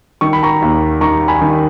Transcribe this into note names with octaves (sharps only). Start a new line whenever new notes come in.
D#3 C#6
B5
A#5 C#6
D#2
D#3 A#5 C#6
G#5 B5
D#3